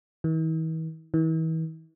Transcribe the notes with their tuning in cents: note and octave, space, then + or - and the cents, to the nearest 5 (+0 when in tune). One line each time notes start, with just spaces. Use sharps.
E3 -45
E3 -40